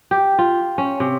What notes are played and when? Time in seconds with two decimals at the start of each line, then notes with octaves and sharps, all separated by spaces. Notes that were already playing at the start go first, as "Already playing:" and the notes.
0.11 G4
0.39 F4
0.78 C#4
1.00 C3